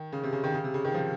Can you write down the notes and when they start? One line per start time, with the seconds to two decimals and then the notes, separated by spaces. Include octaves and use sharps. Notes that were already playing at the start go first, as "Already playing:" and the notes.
Already playing: D#3
0.12 C#3
0.23 C3
0.33 C#3
0.44 D#3
0.54 C#3
0.64 C3
0.74 C#3
0.85 D#3
0.94 F3